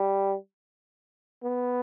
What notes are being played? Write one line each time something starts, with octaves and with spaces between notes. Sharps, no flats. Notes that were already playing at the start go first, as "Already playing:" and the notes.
Already playing: G3
B3